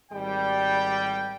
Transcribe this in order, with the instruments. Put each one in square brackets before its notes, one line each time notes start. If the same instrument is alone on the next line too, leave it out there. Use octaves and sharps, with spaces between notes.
[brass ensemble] G#1 G3 G5